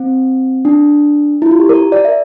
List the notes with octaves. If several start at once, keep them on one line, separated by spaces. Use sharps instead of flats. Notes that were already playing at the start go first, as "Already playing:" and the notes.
Already playing: C4
D4
E4
F4
G4
A#4
D5
E5